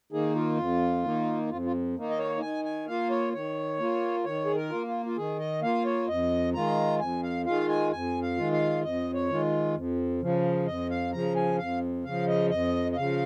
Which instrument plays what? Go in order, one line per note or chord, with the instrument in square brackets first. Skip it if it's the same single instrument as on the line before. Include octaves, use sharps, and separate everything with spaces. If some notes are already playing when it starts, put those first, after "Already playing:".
[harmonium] D#3 A#3 D#4 G#4
F4
F2
D#3 A#3 D#4
F2 F4
F4
D#3 A#3 D#4
D#5
C#5
D#3 G#5
G#5
A#3 F4 F5
C#5
D#3 C#5
A#3 F4
D#3 C#5
G#4
A#4
A#3 F4
F4
F4
D#3 G#4
D#5
A#3 F4 F5
C#5
F2 D#5
D#3 G#3 F4 A#5
F2 G#5
F5
D#3 G#3 F4 F5
G#5
F2 G#5
F5
D#3 G#3 F4
F5
F2 D#5
C#5
D#3 G#3 F4
F2
C#3 F3
F2 D#5
F5
C#3 F3 A#5
G#5
F2 F5
C#3 F3 F5
D#5
F2 D#5
D#5
C#3 F3 F5